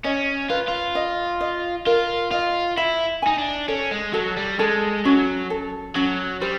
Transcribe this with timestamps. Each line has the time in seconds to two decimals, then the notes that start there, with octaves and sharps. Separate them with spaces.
0.04 C#4 D#5
0.50 F4 B4
0.68 F4
0.95 D#5
1.41 D#5
1.86 F4 A#4
2.31 F4 D#5
2.77 E4 E5
3.22 D#4 G#5
3.38 D4
3.68 C#4 A4
3.91 G#3
4.13 F#3 A4
4.37 G3
4.59 G#3 A4
5.05 F#3 C#4
5.50 A4
5.95 F#3 C#4
6.41 G3 C5